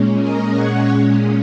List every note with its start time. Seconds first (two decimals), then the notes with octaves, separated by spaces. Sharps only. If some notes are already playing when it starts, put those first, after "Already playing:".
Already playing: A#2 G#3 C#4
0.20 A#4 D#5
0.55 C#5 F#5